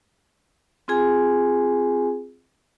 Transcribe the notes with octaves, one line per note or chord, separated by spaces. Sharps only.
C4 F4 G#4 G#5